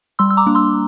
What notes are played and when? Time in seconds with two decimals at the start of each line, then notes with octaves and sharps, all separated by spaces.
0.19 G3 C6 E6
0.30 E6
0.37 A#5 D6
0.47 A#3 D4
0.55 C6 E6